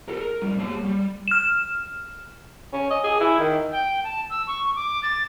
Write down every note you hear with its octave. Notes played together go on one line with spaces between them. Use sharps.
A4 A#4
A#4
A2 G3
A#3 C#5
G3
F6 E7
C#4
D#5
G#4
E4
D#3
G5
A5
E6
C#6
D6
A6